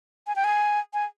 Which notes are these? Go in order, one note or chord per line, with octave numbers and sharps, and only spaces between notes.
G#5
G5
G#5
G#5